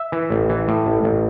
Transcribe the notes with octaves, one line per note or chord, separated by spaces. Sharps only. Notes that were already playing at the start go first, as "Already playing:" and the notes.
Already playing: E5
E3
A1
E3
A2
A1
A1